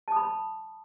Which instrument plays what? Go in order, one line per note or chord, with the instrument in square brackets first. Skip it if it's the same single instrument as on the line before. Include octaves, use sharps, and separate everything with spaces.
[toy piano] A5
D#6
B5